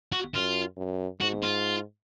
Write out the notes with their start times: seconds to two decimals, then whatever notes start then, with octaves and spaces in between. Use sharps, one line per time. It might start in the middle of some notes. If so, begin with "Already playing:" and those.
0.12 F#4
0.34 F#2 F4
0.77 F#2
1.21 G#2 F#4
1.43 F4